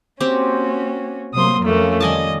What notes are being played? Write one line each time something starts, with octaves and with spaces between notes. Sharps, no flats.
A#3 C4 C#4 F#4 G4
C3 F#3 A#3 C5 C6 D#6
F2 A3 A#3 C#4 F4
D#3 G3 D5 D#5 G#5 A5